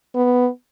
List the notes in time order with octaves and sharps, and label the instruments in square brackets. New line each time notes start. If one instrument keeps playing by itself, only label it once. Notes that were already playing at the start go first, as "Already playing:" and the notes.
[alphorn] B3